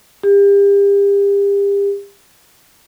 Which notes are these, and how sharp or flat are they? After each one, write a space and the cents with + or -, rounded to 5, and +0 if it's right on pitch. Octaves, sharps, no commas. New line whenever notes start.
G4 +35